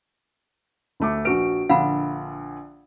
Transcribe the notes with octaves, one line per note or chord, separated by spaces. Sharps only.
D2 A3 D6
A#1 F#4 B4 D7
A#1 D3 F5 F#5 B5